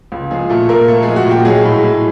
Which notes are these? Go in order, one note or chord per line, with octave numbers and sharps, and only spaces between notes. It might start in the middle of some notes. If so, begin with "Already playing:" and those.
C#2
F3 G#3 G#4
A#2 A3 A4
A#2 A#3 A#4
A3 A4
G#3 G#4
F3
F#4
A#2 G4
F#3 G#3 G#4
A2
A2